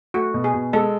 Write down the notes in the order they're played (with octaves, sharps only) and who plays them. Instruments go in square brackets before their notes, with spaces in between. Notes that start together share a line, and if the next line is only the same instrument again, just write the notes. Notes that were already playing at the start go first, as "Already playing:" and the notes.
[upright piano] A3 [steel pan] F#4
[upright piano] B2
[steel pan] G#4
[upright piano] B2
[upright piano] G#3 [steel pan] A4